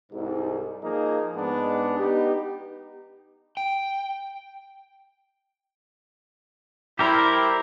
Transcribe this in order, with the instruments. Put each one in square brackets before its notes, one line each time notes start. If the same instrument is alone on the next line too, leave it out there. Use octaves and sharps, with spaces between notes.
[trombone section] C2 G#2
F3 A#3 D#4 G#4
G#2 G#3 B3 D4
B3 D#4 G4
[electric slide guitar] G5
[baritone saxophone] G3 [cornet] E4 [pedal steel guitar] G4 A#4 C5